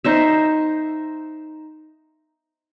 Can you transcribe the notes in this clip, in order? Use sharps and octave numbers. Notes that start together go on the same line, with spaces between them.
D#4 C5 E5